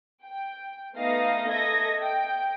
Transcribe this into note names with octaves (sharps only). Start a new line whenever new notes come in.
G5
A3 B3 D#4 F5 D#6 A#6
A4 D#5 E5 D#6 G#6 A#6
G5